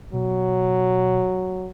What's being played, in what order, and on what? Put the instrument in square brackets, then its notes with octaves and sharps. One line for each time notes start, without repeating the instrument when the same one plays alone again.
[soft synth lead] B2 [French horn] F#3